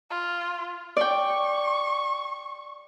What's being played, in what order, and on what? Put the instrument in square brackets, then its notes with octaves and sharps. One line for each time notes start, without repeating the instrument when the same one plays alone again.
[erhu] F4
[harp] D5 G5 [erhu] C#6